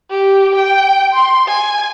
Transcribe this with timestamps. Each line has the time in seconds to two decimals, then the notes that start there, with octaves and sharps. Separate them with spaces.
0.10 G4
0.55 G5
1.13 C6
1.48 G#5